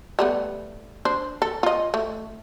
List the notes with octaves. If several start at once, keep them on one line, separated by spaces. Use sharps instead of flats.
G3 A3 B3
D4 C5
A4
F4 D#5
A3